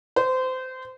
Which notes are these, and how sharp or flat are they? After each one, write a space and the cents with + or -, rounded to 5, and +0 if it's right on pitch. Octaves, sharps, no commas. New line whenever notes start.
C5 -25